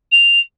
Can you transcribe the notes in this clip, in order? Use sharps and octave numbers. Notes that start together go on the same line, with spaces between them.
F7